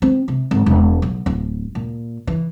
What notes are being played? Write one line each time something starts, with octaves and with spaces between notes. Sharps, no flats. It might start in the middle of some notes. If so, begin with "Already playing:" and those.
C4
C3
G#1
E1
B1
D1
A#2
E3